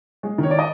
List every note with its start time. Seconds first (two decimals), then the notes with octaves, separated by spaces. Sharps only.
0.23 G#3
0.38 D#3 C#5
0.51 D5
0.59 D#5